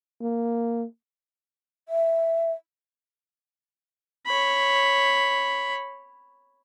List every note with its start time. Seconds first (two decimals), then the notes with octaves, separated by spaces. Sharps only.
0.21 A#3
1.89 E5
4.26 C#5 B5